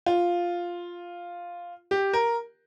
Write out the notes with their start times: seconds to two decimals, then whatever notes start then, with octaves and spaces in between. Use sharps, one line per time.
0.06 F4
1.91 G4
2.13 A#4